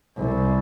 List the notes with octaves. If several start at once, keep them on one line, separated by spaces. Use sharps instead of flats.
C2